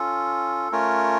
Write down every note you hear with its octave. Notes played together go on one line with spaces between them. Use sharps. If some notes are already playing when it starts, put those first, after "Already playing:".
Already playing: C#4 F4 A4
A3 C#4 F4 A#4 C#5